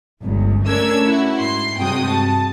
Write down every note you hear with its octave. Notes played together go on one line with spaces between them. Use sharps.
G1 C#2
A3 C#4 D4 A#4 E6 G#6
E4 F#4
G#2 C6
G2 C3 G#3 F#4 G5 D#6
A5